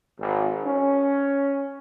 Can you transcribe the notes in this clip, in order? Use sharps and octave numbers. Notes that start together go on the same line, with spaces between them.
G#1
C#4